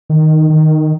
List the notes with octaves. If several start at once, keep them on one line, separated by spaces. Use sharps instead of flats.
D#3
D#3